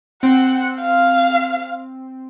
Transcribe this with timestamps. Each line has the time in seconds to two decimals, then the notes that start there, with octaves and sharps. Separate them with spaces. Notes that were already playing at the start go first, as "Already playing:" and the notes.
0.23 C4 F#5
0.81 F5